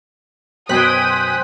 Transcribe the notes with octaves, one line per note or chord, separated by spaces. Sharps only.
F#2 B2 C5 G5 G#5 D#6 F#6 B6